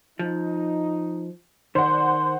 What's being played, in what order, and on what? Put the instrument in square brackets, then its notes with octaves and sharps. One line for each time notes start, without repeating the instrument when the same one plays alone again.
[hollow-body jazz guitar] F3 [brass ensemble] D#4
[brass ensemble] B1 D5 [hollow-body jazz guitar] D#3 [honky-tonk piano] C5 F#5 [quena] C6